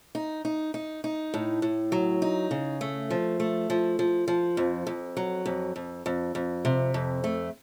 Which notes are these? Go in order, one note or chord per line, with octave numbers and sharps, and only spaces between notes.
D#4
D#4
D#4
D#4
A2
A2
F#3
D#4
C#3
A3
F3
A3
F3
F3
F3
F2
F2
F#3
F2
F2
F2
F2
C3
F2
A3